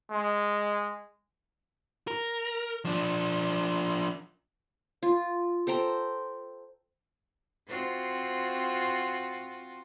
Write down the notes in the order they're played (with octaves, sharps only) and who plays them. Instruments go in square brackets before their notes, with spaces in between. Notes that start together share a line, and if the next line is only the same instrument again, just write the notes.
[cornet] G#3
[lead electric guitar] A#4
F3 D4
[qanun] F4
A4 C5 G5 A#5
[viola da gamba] C4 F4 F#4